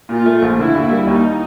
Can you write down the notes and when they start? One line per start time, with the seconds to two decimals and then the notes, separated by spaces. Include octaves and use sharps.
0.09 A#2 F4
0.26 A3
0.42 A#1
0.59 D3 E4
0.75 D#2
0.91 G3
1.07 D#2 D#4